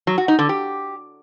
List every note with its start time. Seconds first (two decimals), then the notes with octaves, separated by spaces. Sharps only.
0.07 F#3
0.18 F#4
0.28 D#4
0.39 D3
0.49 G4